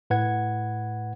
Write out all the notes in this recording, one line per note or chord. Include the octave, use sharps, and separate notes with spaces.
A2 B4 F#5 G#6